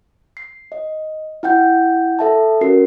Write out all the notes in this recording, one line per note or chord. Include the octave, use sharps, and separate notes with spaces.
C7
D#5
E4 F#5 G5 G6
A4 E5 A5
C#4 F#4 A#4 C7